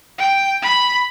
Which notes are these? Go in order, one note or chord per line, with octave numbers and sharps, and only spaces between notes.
G5
B5